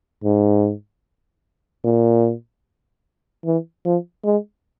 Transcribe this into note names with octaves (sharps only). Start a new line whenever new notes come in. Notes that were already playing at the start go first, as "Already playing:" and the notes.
G#2
A#2
E3
F3
G#3